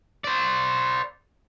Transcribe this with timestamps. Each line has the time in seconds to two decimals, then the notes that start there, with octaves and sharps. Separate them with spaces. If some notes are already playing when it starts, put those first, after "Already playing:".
0.24 C5 D5